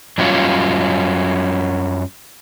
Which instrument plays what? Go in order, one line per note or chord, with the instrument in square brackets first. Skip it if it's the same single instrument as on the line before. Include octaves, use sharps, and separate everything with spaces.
[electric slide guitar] F#2 F#3 G3 C#4 D4 F4